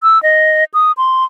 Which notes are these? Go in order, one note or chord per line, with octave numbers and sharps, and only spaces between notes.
E6
D#5
D#6
C6